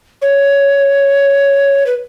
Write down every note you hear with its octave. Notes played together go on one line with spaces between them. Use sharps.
C#5
B4